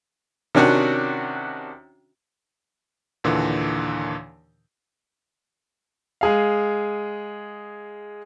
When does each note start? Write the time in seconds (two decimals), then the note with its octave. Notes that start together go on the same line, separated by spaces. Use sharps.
0.55 C3 D#3 C#4 D4 F#4 F#5
3.24 D#2 A#2 D3 E3
6.21 G#3 G#4 F5